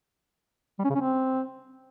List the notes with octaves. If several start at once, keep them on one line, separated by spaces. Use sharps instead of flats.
G3
C#4
C#3
C#4
C4